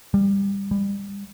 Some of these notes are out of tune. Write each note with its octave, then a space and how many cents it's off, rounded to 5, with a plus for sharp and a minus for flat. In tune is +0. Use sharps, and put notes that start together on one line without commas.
G3 +20
G3 +30